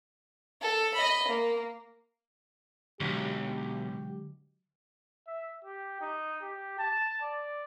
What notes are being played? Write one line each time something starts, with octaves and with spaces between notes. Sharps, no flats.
A4
D#5 B5
A#3
B1 D3 F#3 G#3 G4
E5
G4
D#4
G4
A5
D5